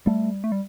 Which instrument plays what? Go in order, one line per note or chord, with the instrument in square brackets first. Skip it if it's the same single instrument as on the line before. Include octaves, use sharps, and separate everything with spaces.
[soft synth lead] G3 [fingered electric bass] A3
[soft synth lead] A3
G3